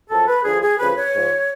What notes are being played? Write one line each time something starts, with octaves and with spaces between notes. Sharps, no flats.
F#2 F3 A4
B4
D2 D3 F3 G#4
G#4
D2 C#3 F3 B4
C#5
G#2 F3